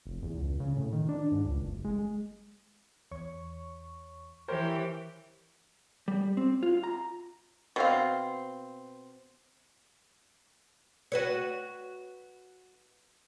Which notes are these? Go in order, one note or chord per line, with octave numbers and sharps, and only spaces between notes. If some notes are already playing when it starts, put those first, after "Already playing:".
F1
E2
C#2
C#3
A2
D#3
D4
G#2
C#2
F#1
G#3
E2 C#5 C#6
E3 G4 A#4 C5 C#5
G3
C4
F4
A#5
B2 C4 F5
F#4 B4 C#5